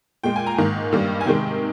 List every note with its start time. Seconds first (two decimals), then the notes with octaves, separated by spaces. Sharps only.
0.23 A#2 G#3 G5
0.36 G#5
0.47 A#5
0.58 G#2 D#3 A#3
0.92 G2 D#3 G3 A#3
1.21 G#5
1.26 C3 D#3 G#3 G5